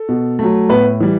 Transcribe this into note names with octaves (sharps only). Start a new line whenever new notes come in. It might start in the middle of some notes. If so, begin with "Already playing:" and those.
Already playing: A4
B2
F#3 A3
A2 B3 B4
E3 G3